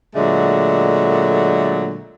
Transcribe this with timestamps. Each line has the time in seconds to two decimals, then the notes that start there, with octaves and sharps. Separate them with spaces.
0.15 A#2 D3 F#3 G#3 A3